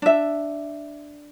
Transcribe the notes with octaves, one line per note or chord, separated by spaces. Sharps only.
D4 E5